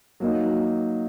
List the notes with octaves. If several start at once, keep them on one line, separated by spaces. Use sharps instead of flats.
F#3 A#3 D#4